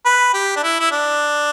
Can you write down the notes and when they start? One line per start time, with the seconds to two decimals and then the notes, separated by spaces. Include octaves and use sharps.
0.05 B4
0.34 G4
0.57 D4
0.63 E4
0.80 E4
0.92 D4